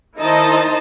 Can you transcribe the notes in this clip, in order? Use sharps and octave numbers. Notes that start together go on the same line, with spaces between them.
D#3 D#4 E4 C5 D#5 A5